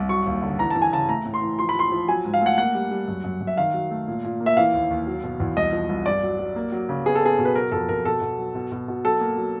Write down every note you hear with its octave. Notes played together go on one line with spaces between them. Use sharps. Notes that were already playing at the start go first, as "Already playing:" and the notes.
Already playing: C2
F#3 C#6
D#2
D3
E3 A#5
A5
E3
G#5
C#3 A5
A3 A#5
A2
C6
E3
F3 C6
B5
F3 C6
F3
F#3 G#5
G#2
F5
A3 F#5
A#3 F#5
G3
G3
F#2
F#2
F#2
E5
D#3 F5
F#3
A3
A#2
A#2
A#3
E5
E3 F5
D#2
D#2
F#3
B2
E2
C2 D#5
F3
C2
G2 D5
F#3
F#3
A#3
F#3
C#3
B3 G#4
A4
B3 G#4
B2
B4
F#3 A#4
F2 A4
F2 A#4
B2 A4
B2
F#3
B2
B2
B2
F#3 A4
A#3
F#3